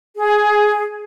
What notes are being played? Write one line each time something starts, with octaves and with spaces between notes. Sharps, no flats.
G#4